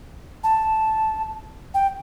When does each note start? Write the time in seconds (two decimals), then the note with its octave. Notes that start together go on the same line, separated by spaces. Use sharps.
0.44 A5
1.74 G5